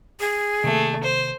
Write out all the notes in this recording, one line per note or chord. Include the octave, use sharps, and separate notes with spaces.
G#4
C3 D#3 A3 A#3
C5